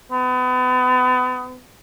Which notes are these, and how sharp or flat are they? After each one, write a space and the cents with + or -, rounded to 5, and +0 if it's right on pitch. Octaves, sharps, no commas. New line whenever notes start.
B3 +35